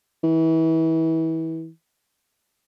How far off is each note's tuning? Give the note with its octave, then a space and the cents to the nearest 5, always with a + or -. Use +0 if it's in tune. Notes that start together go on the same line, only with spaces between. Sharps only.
E3 -30